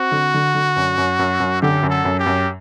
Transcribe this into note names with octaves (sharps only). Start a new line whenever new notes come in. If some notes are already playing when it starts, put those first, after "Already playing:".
Already playing: C4 F#4
D3
D3
D3
F#2
F#2
F#2
F#2
D3 G4
F#2
A4
F#2
G4
F#2